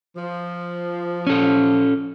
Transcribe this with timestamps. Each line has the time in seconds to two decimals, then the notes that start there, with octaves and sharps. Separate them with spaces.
0.16 F3
1.27 C#4 A4